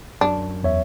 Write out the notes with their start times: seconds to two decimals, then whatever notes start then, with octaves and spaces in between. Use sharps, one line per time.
0.21 F#2 D4
0.63 E2 C#5 E5